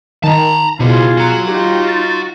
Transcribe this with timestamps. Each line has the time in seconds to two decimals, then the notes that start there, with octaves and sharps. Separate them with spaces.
0.23 D#3 A5 A#5
0.80 B2 E4 F4 G#4 C5
1.17 F#4 A#5
1.48 D#4 F4 G4
1.88 A6